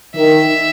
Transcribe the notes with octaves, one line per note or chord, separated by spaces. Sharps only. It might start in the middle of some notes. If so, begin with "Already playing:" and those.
D#3 E5